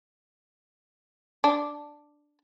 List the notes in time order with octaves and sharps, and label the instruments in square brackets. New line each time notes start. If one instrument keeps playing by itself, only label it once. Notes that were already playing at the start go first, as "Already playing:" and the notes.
[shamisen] D4